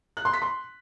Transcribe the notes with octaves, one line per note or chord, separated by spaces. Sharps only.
F#6
C6
B6
C6